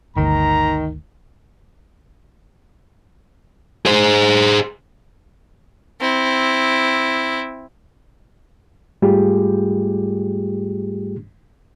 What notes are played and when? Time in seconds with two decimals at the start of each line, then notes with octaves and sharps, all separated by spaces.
0.16 G1 D2 D#3 A#5
3.86 G#4 C5
6.00 C4 E4
9.02 G#2 G3 A3 F4 G4 G#4